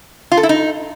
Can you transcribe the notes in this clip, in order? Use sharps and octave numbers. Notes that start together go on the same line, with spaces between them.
F4
A4
E4
D#4